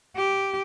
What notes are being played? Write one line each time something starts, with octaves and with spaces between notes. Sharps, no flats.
G4